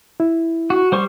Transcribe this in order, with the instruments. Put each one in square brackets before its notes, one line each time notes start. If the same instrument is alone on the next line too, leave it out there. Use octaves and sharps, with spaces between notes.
[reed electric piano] E4
[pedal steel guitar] F#4
G3 C5 C#6